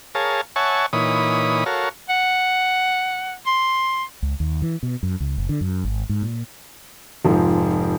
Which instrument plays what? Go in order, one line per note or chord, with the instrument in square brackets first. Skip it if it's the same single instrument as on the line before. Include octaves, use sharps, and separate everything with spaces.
[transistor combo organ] G#4 A#4 C#5 F5 A5
C#5 E5 F#5 G#5 A5 C#6
A#2 E3 D#4 C#5 B5 D#6
F#4 A4 A#4 C#5 F5
[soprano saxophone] F#5
C6
[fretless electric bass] C#2
D#2
E3
B2
F#2
C#2
F#1
D3
F#2
G#1
G#2
A#2
[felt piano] F1 G#2 F3